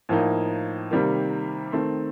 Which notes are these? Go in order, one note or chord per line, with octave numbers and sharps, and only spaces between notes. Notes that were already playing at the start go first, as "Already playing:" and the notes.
A2 F3 A#3 D#4
C3 D#3 G3 A#3
D#3 A3 C4